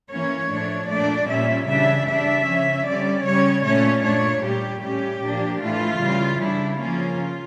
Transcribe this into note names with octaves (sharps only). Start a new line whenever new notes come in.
E3 A#3 C#4 C#5
A2 F3 A3 D4
A#2 A3 D4 D5
A#2 G3 C#4 E5
C#3 E3 G3 D4 E5
C#3 G3 D4 E5
C#3 F3 C#4
D3 G3 C#4 D5
C#3 G3 C#4 C#5
A#2 A3 C#4 C#5
A#2 A3 D4 C#5
A#2 G3 A#3 G4
A2 G3 C#4 G4
A#2 F3 A#3 D4
A2 E3 A3 F4
C#3 E3 G3
C#3 G3 D4 E4
C#3 F3 A#3 C#4 F4